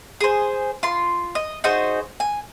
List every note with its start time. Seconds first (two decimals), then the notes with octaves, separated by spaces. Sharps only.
0.21 G#4 C5
0.83 F4 C6
1.35 D#5
1.64 D#4 F#4 G#4 C5
2.20 G#5